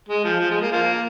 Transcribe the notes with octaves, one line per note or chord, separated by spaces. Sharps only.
G#3
F3
F3
G#3
A#3
F3 A#3